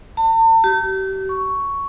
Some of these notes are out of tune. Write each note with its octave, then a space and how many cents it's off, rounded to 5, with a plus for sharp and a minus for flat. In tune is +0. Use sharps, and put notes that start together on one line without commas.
A5 +45
G4 -35
C#6 +5